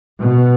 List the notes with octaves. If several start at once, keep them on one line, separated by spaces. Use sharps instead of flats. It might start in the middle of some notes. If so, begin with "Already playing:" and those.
B2